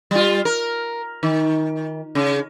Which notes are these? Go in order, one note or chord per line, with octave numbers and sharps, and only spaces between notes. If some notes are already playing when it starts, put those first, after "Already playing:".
G3 F4
A#4
D#3
C#3